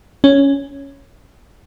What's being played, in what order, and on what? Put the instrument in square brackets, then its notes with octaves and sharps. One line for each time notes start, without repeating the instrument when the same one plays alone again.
[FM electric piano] C#4